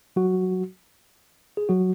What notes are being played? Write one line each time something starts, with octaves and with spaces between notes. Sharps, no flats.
F#3 F#4
G#4
F#3 F#4